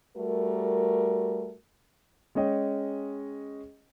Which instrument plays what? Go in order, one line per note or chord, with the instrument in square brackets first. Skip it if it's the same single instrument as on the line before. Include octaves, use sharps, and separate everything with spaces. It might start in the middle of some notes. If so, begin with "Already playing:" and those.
[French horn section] G3 A3 F#4 A#4
[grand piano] G#3 C#4 C#5 D#5 G5